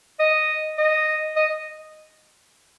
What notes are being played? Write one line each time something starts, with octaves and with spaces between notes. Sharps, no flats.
D#5
D#5
D#5